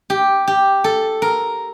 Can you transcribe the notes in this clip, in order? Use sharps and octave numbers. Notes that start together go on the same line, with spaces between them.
G4
G4
A4
A#4